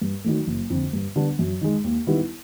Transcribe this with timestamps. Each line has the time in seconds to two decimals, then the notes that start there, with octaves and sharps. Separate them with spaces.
0.01 G2
0.24 D#3 F#3 A3
0.47 F#1
0.70 F2 D3
0.93 G2
1.16 D3 G3 B3 D4
1.39 F#2
1.61 D#3 G#3
1.84 D#2
2.07 D#3 G3 B3 E4